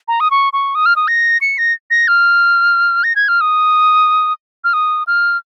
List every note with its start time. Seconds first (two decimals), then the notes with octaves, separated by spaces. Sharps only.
0.08 A#5
0.20 D#6
0.31 C#6
0.53 C#6
0.75 D#6
0.86 F6
0.96 D#6
1.08 A#6
1.41 C#7
1.58 A#6
1.91 A#6
2.08 F6
3.04 A#6
3.16 G#6
3.28 F6
3.41 D#6
4.64 F6
4.73 D#6
5.07 F6